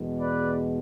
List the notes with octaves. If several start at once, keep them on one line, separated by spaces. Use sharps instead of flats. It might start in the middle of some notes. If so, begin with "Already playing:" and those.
Already playing: E2 B2 G#3
B4 D5